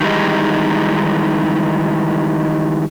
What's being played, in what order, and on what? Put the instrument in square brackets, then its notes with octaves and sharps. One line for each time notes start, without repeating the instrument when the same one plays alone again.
[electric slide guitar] D#3 E3 G3 G#3 D#4